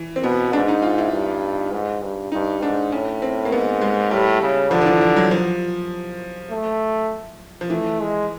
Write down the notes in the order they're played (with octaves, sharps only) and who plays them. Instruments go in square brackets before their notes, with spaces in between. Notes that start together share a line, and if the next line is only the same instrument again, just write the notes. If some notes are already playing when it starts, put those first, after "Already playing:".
Already playing: [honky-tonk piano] E3
C4
[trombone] B2 [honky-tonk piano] B3
[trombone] G#2 [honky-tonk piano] D4
[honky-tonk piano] D#4
F4
E4
[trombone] G2
G#2
G2
[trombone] G2 [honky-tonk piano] D#4
[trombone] G#2 [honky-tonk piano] D4
[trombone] A2 [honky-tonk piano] C#4
[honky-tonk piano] C4
A#3
[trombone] G#2 [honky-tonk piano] B3
[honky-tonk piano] G#3
[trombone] A2 [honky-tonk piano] G3
[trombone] C#3
[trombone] D3 [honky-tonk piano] F3
[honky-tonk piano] F3
E3
F3
F#3
F3
[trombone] A3
[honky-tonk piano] F3
[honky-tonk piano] E3 [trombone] A3
[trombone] G#3